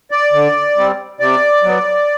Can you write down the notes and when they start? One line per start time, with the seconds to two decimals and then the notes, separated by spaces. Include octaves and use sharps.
0.11 D5
0.33 D3
0.76 G3 C4
1.20 C3 D5
1.63 F#3 B3